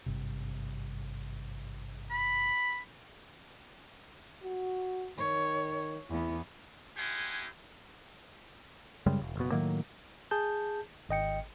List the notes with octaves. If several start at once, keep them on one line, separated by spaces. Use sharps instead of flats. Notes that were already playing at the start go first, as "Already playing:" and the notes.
G#1 G2 C3
B5
F#4
D#3 C#5
E2 B3 E4
D#4 E4 G4 F#5 G#5 C6
F#2 C#3 G3 G#3
E1
F#1 B2
A2 D#3 F#3 A#3
G#4 A5 G6
G#1 D#5 G5 C#7